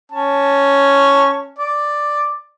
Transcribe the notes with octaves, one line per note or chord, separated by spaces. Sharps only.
C#4 A5
D5